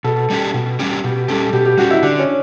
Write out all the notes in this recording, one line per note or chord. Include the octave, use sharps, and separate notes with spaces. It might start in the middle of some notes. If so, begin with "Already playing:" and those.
B2 A4
G3 C#4 G4
B2
G3 C#4 G4
B2 G4
G3 C#4 G4 A4
B2 G4
G4
G3 C#4 F#4 G4
E4
D3 D4
C#4